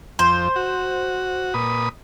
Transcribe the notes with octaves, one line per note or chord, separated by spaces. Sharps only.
F2 C5
F#4
A#2 B4 D#6